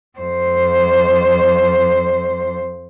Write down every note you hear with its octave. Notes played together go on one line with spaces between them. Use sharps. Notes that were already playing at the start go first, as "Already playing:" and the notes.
F2 C5